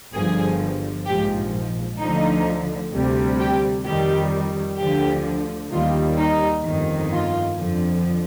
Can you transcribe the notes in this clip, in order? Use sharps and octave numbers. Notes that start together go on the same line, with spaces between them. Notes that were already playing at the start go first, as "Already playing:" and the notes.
G1 G2 D3 F3 G#4
A#1 G#2 F3 G4
D2 D3 F3 D#4
D2 C3 G3
G4
F2 D#3 G3 G4
D2 D3 F3 G4
D#2 D#3 G3 F4
D#4
G1 F2 D#3
F4
F2 D3 F3